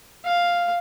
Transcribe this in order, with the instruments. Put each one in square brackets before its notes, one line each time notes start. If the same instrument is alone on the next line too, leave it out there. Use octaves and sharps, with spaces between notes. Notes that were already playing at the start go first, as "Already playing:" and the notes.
[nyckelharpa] F5